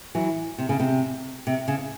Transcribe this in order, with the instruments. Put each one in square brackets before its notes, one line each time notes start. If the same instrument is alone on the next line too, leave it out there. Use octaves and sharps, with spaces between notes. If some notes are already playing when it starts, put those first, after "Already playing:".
[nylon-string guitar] E3 F#3
C3
C#3
C3
C3
C#3